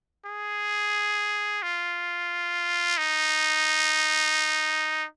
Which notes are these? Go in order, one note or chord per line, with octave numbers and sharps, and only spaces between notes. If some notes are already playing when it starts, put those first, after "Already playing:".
G#4
F4
D#4